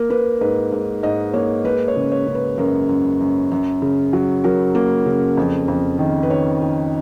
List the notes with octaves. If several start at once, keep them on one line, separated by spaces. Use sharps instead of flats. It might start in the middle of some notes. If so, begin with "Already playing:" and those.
Already playing: A#3 A#4
A#3 B4
G#2 B4
G#2
G#2 D#5
A#3 C#5
G#3 B4
C#5
C#3
C#5
C#3
B4
F#2 A#4
F#2
F#2
F#2
C#3
F#3
F#3 A#4
A#3
C#3
F2
F2
D#3
B4
D#3 C#5
D#3